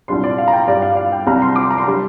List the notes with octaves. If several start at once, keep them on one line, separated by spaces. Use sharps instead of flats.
C2 A#2 G3 D4 C6
D5
F5
A#5
G5
G2 G3 D4 D5
F5
D5
F5
G5
C2 C3 G3 A#5
C6
D6
C6
A#5
C6
G3 D4